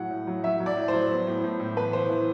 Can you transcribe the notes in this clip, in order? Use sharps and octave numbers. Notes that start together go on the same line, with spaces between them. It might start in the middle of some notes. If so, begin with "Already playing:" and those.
Already playing: A2 F#3 F#5
A2
F#3
F#3 E5
F#3
D5
A2
F#3 C5
B3
A2
A2
A2
E3 B4
E3 C5
E3